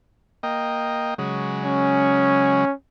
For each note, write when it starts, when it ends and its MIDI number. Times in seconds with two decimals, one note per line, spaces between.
0.43 1.14 58
0.43 1.14 75
0.43 1.14 79
1.18 2.65 49
1.18 2.65 54
1.18 2.65 56
1.64 2.73 61